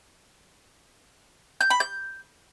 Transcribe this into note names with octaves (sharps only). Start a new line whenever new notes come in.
G6
B5
G6